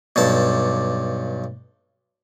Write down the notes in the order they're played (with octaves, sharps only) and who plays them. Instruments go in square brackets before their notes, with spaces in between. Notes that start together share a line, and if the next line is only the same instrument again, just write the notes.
[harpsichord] B1 G2 A5